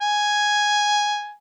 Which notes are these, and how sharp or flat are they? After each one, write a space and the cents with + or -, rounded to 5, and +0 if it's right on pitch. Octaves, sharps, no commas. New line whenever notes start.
G#5 +0